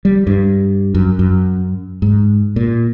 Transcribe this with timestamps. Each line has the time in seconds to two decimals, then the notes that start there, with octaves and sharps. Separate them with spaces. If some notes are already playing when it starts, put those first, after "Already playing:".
0.05 G3
0.27 G2
0.95 F#2
1.19 F#2
2.02 G#2
2.56 A#2